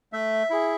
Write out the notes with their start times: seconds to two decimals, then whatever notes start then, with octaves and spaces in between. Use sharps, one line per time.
0.13 A3 E5
0.50 E4 G#4